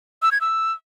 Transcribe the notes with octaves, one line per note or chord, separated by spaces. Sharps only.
E6
G#6
E6